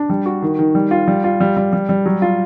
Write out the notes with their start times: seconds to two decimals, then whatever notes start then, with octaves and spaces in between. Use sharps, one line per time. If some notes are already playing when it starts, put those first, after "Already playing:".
Already playing: D4
0.10 G3
0.26 F#4
0.42 D#3
0.59 D#3
0.75 G3
0.91 F4
1.08 G3
1.24 F4
1.40 G3
1.57 G3
1.73 G3
1.89 G3
2.06 F#3
2.22 F4